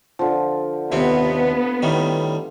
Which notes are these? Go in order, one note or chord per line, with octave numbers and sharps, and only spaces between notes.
D3 F3
D#2 C3 B3 C4
A2 D#3 G3